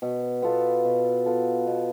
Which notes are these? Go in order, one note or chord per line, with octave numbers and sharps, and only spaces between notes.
B2
B3 F4 A4
B2
B3 F4 A4
B2